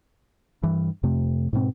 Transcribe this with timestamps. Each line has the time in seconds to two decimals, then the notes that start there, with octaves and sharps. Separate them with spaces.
0.63 G2 E3
1.03 F2 C3 A3
1.53 G#2 B2 C4